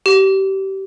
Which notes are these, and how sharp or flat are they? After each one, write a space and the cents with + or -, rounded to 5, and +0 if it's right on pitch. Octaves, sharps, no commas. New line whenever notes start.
G4 -25